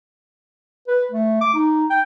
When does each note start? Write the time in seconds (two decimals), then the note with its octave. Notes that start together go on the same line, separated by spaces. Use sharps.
0.88 B4
1.11 A3
1.41 D6
1.54 D#4
1.90 G5